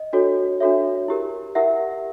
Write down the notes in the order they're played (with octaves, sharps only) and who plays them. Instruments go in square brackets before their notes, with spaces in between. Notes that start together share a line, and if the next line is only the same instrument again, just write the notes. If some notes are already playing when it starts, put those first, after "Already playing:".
Already playing: [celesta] D#5
D4 F#4 A4 C#5
D4 F#4 A4 C#5 E5
E4 G4 A#4
E4 G4 A#4 E5 F#5